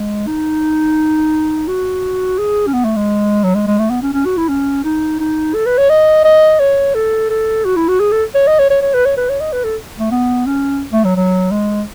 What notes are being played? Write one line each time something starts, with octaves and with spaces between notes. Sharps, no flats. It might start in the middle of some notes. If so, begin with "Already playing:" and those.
Already playing: G#3
D#4
F#4
G#4
C#4
B3
A3
G#3
F#3
G#3
G#3
A3
B3
C#4
C#4
F#4
E4
C#4
D#4
D#4
A4
B4
C#5
D#5
D#5
C#5
A4
A4
F#4
E4
F#4
G#4
A4
C#5
D#5
C#5
C#5
C#5
B4
C#5
B4
C#5
D#5
B4
A4
A3
B3
C#4
A3
F#3
F#3
G#3